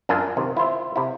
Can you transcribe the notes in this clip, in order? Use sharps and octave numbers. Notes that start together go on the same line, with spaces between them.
F#2 D4 F4 A#4 G#5 A5
C3 D#3
E4 F4 C5 E5
C3 E4